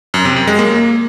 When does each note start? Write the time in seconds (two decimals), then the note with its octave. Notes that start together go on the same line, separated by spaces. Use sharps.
0.14 F#2
0.25 C3
0.36 F#2
0.47 G#3
0.59 A#3